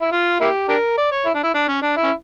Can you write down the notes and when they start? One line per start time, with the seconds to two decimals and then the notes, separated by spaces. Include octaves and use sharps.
0.01 E4
0.12 F4
0.40 A#3 E4 G4
0.68 D4 G4 A#4
0.97 D5
1.11 C#5
1.25 E4
1.34 D4
1.43 E4
1.54 D4
1.68 C#4
1.82 D4
1.97 E4
2.03 C#4